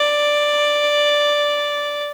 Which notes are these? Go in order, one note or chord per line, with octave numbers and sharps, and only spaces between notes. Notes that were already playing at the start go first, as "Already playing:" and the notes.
Already playing: D5